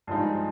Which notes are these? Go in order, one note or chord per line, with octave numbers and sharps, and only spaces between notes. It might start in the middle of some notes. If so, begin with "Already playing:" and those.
G2 F3 G#3 D#4